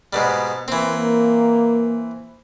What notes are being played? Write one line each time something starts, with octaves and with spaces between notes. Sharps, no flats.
G#2 B2 G3
E3 A#3 C4